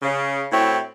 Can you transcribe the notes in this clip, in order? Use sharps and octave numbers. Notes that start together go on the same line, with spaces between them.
C#3
A2 C4 E4 F#4 C#5